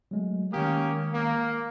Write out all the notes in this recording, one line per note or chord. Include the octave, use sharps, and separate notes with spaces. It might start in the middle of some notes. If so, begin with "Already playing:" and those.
F#3 G#3 A3
D#3 G#3 A#3 C#4 G4 D#6
A#3